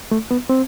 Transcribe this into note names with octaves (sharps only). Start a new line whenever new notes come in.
A3
B3
C4